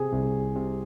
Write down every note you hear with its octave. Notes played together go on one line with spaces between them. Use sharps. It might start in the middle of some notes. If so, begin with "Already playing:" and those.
Already playing: C3 G#4
C2
C3